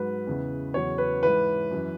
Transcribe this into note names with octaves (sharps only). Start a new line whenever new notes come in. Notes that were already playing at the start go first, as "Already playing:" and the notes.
Already playing: G#2 F#3 B4
E2 C#3 E3
E2 C#3 F#3 C#5
B4
G#2 E3 B4
F#2 E3